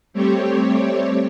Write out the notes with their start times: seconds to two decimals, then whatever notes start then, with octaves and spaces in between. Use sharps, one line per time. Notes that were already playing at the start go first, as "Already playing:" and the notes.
0.13 G3 A3 C4 G4 C#5